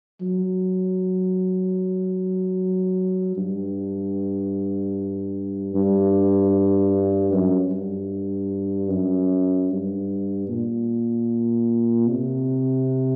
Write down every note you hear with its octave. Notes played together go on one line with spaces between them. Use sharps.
F#3
G2
G2
F#2
G2
F#2
G2
A#2
C3